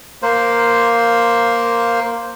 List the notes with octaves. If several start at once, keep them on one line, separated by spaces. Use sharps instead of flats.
A#3 C5